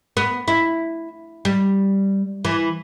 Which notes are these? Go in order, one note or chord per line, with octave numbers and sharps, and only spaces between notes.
B3
E4
G3
E3